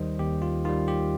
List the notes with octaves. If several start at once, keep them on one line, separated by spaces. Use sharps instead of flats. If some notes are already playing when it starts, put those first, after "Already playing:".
Already playing: D#2 D#3 G3 C5 D#5
D#2 G4
F4
D#3 G3 F4
G4